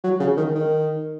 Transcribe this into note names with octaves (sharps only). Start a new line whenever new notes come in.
F#3
C#3
D#3
D#3